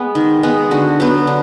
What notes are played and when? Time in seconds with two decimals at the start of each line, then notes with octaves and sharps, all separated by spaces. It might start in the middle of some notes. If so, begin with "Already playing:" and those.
Already playing: G#3 B3
0.15 D#3
0.43 G#3 B3
0.71 D3 F#4
1.00 F#3 B3
1.27 D3